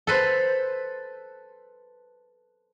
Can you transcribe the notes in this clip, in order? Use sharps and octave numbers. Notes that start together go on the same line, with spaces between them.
A4 B4 C5